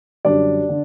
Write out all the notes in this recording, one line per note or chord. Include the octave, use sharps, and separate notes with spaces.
F#2 D3 G3 D4 D5
D3